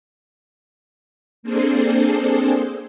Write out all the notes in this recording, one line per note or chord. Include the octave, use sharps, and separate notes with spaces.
A#3 C4 D4 G#4 A4 C5